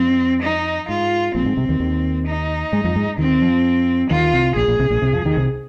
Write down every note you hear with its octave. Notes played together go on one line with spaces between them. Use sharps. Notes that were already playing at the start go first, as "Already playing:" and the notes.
Already playing: F2 C4
D#4
G#2 F4
A#1 A#2 C4
G#2
C2 C3
D#2 D#3
D#2 D#3
D#4
G#2 G#3
F2 F3
G#2 G#3
D#2 D#3 C4
F2 F3
D#2 D#3 F4
C2 C3
A#1 A#2 G#4
A#1 A#2
C2 C3
A#1 A#2
C2 C3
F2 F3
D#2 D#3
C2 C3